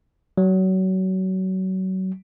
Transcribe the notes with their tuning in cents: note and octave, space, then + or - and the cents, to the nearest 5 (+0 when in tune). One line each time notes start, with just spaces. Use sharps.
F#3 +25